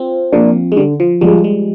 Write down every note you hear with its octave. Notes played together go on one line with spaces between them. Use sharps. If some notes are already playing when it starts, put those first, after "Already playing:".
Already playing: C4 F4
F3 A#3 D4
G#3
D3 G3
F3
F3 G3 G#3
G#3